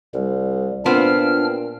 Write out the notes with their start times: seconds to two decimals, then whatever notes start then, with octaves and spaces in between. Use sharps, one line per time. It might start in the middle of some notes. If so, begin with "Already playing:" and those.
0.14 C2 G3
0.86 A#2 B3 C4 D4 F4 F6